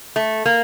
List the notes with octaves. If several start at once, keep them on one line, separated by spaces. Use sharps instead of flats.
A3
A#3